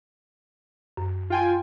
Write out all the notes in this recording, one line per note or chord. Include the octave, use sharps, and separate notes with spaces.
F#2
F4 G5 G#5